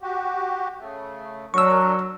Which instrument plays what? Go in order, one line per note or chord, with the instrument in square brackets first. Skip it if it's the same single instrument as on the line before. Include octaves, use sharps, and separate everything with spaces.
[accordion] F#4 G4
C#3 A3
[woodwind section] F#3 [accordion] D4 A#4 [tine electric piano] C#6 E6